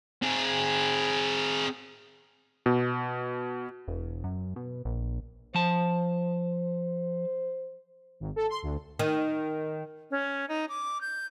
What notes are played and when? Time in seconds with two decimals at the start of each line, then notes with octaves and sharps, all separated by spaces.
0.23 C4 G#4
2.66 B2
3.88 E1
4.24 F#2
4.56 B2
4.85 A#1
5.55 F3 C5 A5
8.20 G#1
8.36 A4
8.50 C6
8.63 D2
8.99 D#3
10.11 C#4
10.49 D#4
10.69 D6
11.01 G6